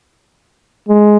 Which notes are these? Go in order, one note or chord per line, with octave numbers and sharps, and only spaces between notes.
G#3